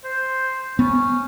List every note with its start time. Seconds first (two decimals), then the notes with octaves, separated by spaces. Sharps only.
0.04 C5
0.79 B3 C#4